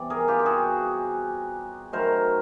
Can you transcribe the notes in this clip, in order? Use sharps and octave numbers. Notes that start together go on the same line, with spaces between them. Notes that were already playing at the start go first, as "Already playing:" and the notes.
Already playing: C3 E3 G3 B3 D5
G#4 A#4
F4 G4
G4
F#4 G#4
D#3 F#3 A3 A#4 C5